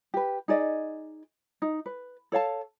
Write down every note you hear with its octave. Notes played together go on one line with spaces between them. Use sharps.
G4 B4
D#4 G#4 D5 D#5
D#4
B4
A4 C#5 F5 A5